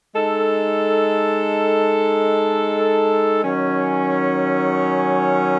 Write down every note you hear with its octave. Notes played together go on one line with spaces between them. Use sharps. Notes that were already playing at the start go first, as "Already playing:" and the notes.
G#3 D#4 A4
D#3 F#3 C#4